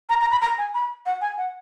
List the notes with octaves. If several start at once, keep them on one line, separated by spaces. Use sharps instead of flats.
A#5
A#5
B5
A#5
G#5
B5
F#5
G#5
F#5